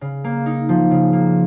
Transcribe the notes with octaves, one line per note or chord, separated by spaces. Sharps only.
C#3
A#3
D#4
F3
C#3
A#3